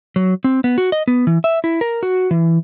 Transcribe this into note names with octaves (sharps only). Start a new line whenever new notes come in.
F#3
C4
B3
F#4
D#5
B3
E3
E5
E4
A#4
F#4
E3